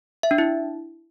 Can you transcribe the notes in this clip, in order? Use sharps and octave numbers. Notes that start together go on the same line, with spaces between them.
E5
D4
E4